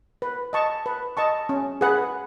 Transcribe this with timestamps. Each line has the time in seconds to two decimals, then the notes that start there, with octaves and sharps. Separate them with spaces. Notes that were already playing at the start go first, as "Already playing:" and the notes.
0.22 B4
0.53 D#5 A5 C#6
0.86 B4
1.17 D#5 A5 C#6
1.49 C#4
1.81 G#4 B4 F#5